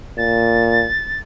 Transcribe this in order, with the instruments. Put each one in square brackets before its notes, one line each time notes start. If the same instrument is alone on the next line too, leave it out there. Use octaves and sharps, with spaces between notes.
[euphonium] A#2 [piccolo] A6